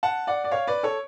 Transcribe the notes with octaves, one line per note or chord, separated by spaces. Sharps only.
F#5 A5
D5 F#5
D5
C#5 F5
B4 D5
A4 C#5